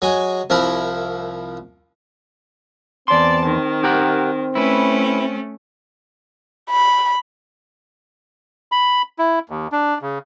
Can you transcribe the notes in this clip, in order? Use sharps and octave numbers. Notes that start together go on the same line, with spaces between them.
F#3 G#3 G#5
C2 F3 E4 A#4
E2 C4 D5 A5 C6
D#3
G4 A#4 F#5
A3 C#4 E4 B4
B5
B5
E4
D#2
D4
C#3